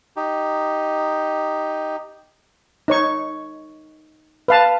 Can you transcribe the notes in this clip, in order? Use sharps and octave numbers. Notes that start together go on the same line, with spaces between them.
D#4 G4
D#4 C#5 C#6
B4 F5 A5